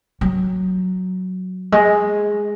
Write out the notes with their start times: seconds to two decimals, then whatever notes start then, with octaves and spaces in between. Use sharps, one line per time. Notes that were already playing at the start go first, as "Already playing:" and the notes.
0.21 F#3
1.72 G#3